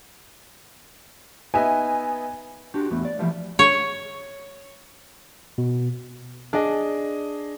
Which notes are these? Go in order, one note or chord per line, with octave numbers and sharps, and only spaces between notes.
B3 D#4 E5 G#5
D4 F#4 G4
E2 A3 B3
D5
E3 F3 G3 A3 E4
C#5
B2
D4 G#4 D#5